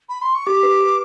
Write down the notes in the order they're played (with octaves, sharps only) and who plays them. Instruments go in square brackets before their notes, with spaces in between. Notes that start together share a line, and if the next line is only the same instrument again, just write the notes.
[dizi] B5
C6
C#6
[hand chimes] G4 [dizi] D6
[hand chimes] B4
B4